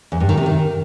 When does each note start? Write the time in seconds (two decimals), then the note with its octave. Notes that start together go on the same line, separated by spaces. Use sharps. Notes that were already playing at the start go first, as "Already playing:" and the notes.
0.12 E2
0.20 G2
0.29 D#3
0.37 C3
0.46 D#3